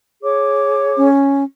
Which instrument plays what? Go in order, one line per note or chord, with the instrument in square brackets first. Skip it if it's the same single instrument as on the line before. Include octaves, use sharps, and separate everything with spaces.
[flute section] G#4 C#5 D6
[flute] C#4